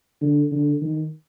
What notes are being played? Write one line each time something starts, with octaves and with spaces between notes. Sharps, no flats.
D3
D3
D#3